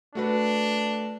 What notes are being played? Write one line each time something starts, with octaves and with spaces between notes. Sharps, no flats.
A3 D4 F#4 B4